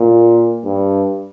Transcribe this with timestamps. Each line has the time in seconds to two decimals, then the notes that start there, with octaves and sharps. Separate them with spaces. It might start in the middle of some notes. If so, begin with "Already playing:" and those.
Already playing: A#2
0.65 G2